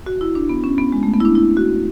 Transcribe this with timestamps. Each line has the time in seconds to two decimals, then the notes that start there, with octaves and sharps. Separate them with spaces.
0.06 F#4
0.21 E4
0.35 D4
0.49 B3
0.64 C#4
0.78 B3
0.92 G#3
1.03 A3
1.13 B3
1.20 E4
1.25 D4
1.35 E4
1.57 F#4